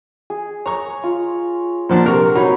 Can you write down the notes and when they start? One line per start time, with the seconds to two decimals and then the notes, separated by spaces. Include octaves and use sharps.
0.30 G#4
0.66 C#5 A#5 C#6
1.04 F4
1.89 A#2 F3 D4 C5 F#5 A#5
2.04 C3 A#4 C#6
2.35 F#3 D#4 C#5 B5